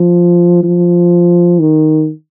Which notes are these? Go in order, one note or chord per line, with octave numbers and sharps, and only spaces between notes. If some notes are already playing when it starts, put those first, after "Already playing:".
Already playing: F3
F3
D#3